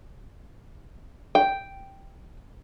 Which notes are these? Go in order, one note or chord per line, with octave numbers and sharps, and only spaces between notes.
G5